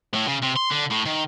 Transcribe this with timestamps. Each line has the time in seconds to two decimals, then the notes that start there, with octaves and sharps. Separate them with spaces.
0.14 A2
0.27 C#3
0.42 C3
0.56 C6
0.71 D3
0.90 A2
1.05 D#3